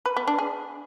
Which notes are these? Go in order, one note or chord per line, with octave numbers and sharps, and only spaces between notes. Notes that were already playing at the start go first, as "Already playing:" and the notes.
B4
B3
D4
G#4